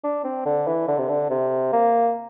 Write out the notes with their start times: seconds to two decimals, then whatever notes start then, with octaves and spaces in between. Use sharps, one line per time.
0.04 D4
0.24 C4
0.46 D3
0.68 E3
0.88 D3
0.98 C3
1.09 D3
1.30 C3
1.73 A#3